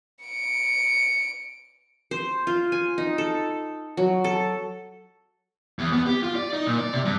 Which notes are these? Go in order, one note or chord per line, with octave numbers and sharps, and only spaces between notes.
C#7 D7
C5
F4
G#5
D#4
A4
F#3
A4
E2
B3
G4
F4
D5
D#4
A#2
D5
C3
G2